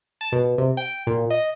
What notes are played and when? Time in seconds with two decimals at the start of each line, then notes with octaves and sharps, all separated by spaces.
0.21 A5
0.32 B2
0.58 C3
0.77 G5
1.07 A#2
1.30 D#5